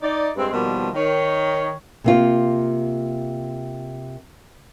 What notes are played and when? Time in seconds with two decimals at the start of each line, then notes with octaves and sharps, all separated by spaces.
0.02 D#4 D5
0.36 G2 G#3 C4
0.52 B2 D#3 F3 G3 A#3
0.95 D#3 C#5
2.04 C3 A#3 F4